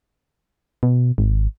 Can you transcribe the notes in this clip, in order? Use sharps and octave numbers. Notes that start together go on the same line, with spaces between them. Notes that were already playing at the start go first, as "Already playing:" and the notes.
B2
G#1